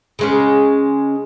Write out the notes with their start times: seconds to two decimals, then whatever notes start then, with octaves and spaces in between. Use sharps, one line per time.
0.19 C#3 G#3 C#4